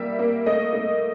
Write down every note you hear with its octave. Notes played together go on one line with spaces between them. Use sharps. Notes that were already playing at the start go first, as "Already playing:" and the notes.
Already playing: G3 A#3 E5
A#3
A3 D#5
A3